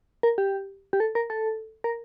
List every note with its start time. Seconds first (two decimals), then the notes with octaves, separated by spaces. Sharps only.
0.23 A#4
0.38 G4
0.93 G4
1.00 A4
1.15 A#4
1.30 A4
1.84 A#4